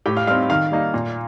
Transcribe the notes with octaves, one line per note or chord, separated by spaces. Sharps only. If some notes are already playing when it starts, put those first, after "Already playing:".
A2 G4 G5
F5 F6
G3 C4 D#4 F5 F6
D#3 F5 F6
G3 A#3 D#4
A#2